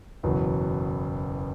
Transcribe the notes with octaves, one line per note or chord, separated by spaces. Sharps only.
F#1 E2 B2 F#3